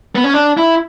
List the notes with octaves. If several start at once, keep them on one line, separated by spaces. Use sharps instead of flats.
B3
C#4
D4
E4